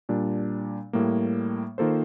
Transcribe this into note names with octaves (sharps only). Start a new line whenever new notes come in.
A#2 G3 D4
A2 G3 A#3
D#3 A#3 F4 A4 C5